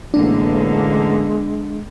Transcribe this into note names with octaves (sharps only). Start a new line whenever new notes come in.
A1 D3 G#3 A#3 B3 D4